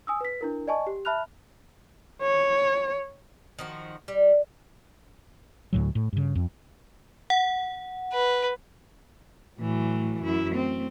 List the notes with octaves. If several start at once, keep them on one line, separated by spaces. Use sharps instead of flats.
G#5 D#6 E6
B4 B6
D4 E4 A#4
D5 D#5 G#5 A5 C#6
G4
E5 A5 B5 F6 F#6 F7
C#5
D#3 F3 F#4
G3
D2 A2 F#3
A2
G2 C#3
F2
F#5
B4
A2 E3 F#3
F#2 E4
A3 C4